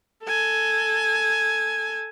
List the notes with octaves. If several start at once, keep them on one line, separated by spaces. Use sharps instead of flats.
A4 G#5